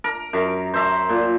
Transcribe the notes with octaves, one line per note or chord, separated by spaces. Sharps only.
A#4
F#2
C5 E5 A#5
A#2